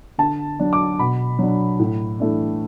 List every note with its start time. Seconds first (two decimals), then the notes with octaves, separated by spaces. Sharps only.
0.18 D3 A5
0.60 F#3 D4
0.73 D6
0.99 B2 B5
1.39 F#3 D4
1.79 A2
2.20 E3 A3 D4